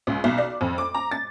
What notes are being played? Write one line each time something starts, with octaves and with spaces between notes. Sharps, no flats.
C#2
B1
D5
F2
D6
A#5
A6